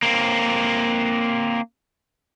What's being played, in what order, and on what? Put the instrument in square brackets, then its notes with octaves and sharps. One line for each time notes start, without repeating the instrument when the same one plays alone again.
[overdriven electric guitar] A#3 C4